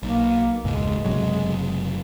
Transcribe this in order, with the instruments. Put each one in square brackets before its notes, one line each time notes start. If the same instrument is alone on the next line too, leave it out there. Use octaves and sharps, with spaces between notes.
[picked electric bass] B1 [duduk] A#3
[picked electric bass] E1 C#2 G#2 [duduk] G#3
[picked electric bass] F#1 C3 F#3